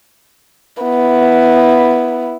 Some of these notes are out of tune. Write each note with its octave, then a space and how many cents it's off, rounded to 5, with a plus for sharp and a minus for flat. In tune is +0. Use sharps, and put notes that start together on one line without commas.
B3 +0 E4 +0